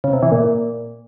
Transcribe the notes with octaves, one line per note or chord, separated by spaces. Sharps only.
C#3
C3
E3
A#2